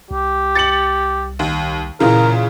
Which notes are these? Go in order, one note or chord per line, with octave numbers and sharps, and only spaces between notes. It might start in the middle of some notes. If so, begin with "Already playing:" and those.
C2 G4
A6 C#7 F#7
D#2
A#2 C#3 E3 F4 A#4